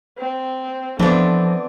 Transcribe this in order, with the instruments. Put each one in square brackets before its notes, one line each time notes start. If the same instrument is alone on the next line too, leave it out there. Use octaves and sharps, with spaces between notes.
[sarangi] C4
[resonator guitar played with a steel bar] E3 D4 [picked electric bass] F3 [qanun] B3 C4 [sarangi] A4